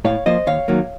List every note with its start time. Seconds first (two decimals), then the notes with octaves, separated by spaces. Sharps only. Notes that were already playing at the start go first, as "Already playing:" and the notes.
0.05 A2 C#5 F5
0.26 F3 A#3 C5 D#5
0.47 D#2 C#5 F5
0.68 D#3 F#3 A#3